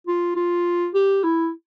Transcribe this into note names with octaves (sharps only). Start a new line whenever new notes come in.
F4
F4
G4
E4